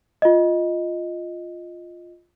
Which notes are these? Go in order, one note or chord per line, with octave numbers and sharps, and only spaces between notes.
F4 D#5